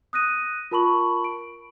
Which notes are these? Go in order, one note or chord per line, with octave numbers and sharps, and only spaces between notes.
D#6 F#6 A#6 D#7
F4 A#4 A5 B5 C#6 F#7
D7